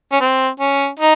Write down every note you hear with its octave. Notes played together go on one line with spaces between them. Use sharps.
C#4
C4
C#4
D#4